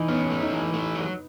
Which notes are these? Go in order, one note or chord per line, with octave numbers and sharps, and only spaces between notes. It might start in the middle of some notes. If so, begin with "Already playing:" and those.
Already playing: E3 D#4
B3 C#4
A3
D#4
E3
A3
F#3